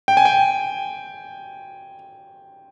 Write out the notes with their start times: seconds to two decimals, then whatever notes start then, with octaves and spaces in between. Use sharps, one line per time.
0.08 G5
0.17 G#5
0.25 G5